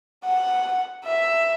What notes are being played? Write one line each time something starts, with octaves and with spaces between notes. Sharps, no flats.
F#5
E5